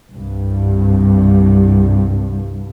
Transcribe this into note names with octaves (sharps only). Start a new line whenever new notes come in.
C2 G2